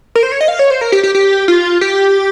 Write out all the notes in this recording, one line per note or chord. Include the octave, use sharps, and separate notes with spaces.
A#4
C5
C#5
D#5
F5
C#5
C5
A#4
G4
G4
G4
F4
G4